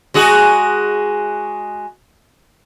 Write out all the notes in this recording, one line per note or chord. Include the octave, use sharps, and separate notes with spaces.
G#3 F#4 G#4